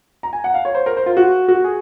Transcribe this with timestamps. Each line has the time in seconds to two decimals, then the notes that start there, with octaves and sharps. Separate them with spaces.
0.23 A#5
0.33 G#5
0.44 F#5
0.54 F5
0.65 C#5
0.75 C5
0.86 A#4
0.97 C5
1.06 F4
1.17 F#4
1.48 F#4
1.64 G#4